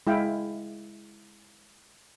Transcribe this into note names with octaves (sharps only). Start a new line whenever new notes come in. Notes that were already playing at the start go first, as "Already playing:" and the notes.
G#3 E4 F5 G5